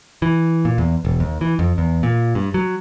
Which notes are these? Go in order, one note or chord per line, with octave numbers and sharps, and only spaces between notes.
E3
A#2
E2
E1
D#2
E3
F2
E2
A#2
G2
F#3